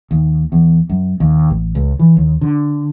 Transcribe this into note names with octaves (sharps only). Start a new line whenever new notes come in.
D#2
E2
F#2
D#2
A1
C#2
E3
D#2
D3